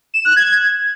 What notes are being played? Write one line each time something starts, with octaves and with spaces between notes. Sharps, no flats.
E7
F#6
G#6